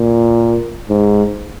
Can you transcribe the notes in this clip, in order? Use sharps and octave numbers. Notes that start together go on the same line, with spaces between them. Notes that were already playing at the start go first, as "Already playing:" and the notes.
Already playing: A#2
G#2